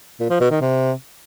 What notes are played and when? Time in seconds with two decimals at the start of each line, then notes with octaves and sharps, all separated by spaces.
0.20 A#2
0.30 F3
0.41 B2
0.51 D#3
0.61 C3